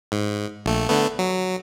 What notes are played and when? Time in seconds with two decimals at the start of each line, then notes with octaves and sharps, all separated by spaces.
0.12 G#2
0.66 A#1 A3
0.89 D3 A3 B3
1.19 F#3